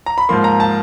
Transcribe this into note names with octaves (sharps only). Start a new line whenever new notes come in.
A#5
B5
G#2 F3 A#3 C6
A#5
A5